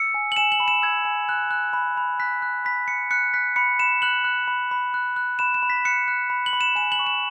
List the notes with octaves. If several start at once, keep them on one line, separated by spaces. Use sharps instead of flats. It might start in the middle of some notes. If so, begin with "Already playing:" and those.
Already playing: E6 C#7
G#5
F#7
G#5 E7
F#7
B5
E7
E6 G#6
G#5
F#6
F#6
B5
B5
F#6 B6
F#6
B5 B6
B5 C#7
F#6 C#7
F#6 B6
B5 C#7
B5 E7
F#6 F#7
F#6
B5
B5
F#6
F#6
B5 E7
E7
B5
B6
F#6 C#7
F#6
B5
F#7
B5
E7
G#5 E7
F#7
C#6
E7